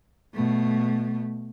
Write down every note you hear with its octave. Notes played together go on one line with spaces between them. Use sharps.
B2 A3